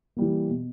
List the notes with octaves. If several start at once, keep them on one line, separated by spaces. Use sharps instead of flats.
E3 G3 A#3
B2